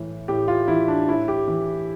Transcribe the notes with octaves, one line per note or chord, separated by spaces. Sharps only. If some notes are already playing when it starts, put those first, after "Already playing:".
Already playing: A2 E3
A2 G4
F4
E3 E4
D4
A2 E4
G4
E3